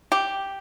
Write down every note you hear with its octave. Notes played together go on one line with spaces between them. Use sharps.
G4